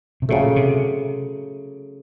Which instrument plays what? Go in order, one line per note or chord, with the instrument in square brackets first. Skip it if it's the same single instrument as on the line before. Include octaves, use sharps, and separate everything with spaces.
[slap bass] C3
[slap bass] A#2 [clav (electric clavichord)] C#3 F#3 A3
[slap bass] C3